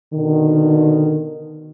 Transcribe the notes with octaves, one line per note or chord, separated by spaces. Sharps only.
B2 D3 D#3